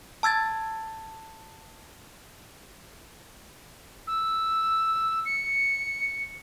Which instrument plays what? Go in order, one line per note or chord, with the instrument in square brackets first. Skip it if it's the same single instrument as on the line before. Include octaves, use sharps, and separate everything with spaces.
[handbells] A5 E6 G#6 A6
[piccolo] E6
C#7